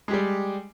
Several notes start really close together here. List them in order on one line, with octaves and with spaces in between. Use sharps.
G#3 G4 G3